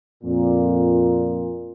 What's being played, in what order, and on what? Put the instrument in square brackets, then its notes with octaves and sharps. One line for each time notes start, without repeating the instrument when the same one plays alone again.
[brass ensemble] F2 A#2